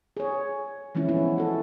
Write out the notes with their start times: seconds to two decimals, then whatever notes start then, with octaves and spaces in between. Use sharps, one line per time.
0.17 G#4 C#5
0.95 E3 F3 G#3 C#4 E4
1.09 G3 B3 C#4 E4
1.38 F#4 A4